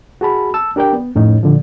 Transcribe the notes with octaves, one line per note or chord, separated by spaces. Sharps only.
F#4 G#4 A5 B5
A5 E6
D4 G4 A#4 D5 G5
B3
F2 A2 C#4 D#4
A#2 D3 F3